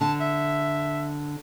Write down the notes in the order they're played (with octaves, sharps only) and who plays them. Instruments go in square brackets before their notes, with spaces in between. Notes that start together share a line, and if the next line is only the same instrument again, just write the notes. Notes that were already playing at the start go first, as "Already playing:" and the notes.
[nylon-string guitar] D3 [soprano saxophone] A5
[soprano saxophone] E5